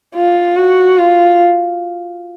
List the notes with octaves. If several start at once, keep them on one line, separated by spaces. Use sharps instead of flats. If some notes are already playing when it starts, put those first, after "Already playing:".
F4
F#4
F4